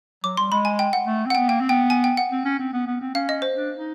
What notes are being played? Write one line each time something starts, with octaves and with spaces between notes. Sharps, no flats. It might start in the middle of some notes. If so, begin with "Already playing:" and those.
F#3 D6
G3 C6
G#3 B5
G#5
G5
F#5
A3
C4 F#5
B3 G5
A#3 G5
C4
B3 G5
G#5
G5
F#5
C4
C#4
C4
B3
B3
C4
C#4 F5
D#5
C5
D4
D#4